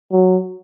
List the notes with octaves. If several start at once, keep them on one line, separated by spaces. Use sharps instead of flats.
F#3